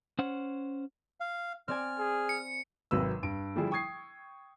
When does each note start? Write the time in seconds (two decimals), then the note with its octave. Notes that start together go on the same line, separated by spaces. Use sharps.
0.19 C#4 C5 F#5
1.20 F5
1.68 C4 D5 G#5 F6
1.99 G#4
2.29 C#7
2.91 G#1 C3 F#3 B4 E6
3.23 G2 D7
3.56 D3 F3 G3 D4 E4 G#4
3.71 G5 C#6 D#6 G#6 C7